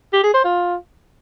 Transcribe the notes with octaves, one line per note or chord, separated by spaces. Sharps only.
G4
G#4
C5
F4